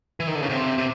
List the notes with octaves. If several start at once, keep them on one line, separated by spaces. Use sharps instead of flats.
E3
D#3
D3
C#3
C3
C3